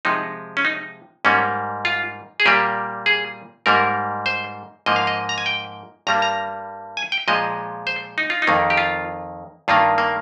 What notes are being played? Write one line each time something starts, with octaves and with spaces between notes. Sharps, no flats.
C3 F3 G#3 D#4
C#4
D#4
G#2 G3 A#3 C#4
F4
G#4
A#2 G3 A#3 G4
G#4
G#2 G3 A#3 A#4
C5
G#2 F3 A#3 D#5
F5
D#5
A#5
G#5
G5
G2 G3 A#3 A#5
A#5
G#5
G5
A#2 F3 G#3 D#5
C5
D#4
F4
D#4
F2 D#3 A#3
G4
F4
G2 D#3 A#3 F4
A#3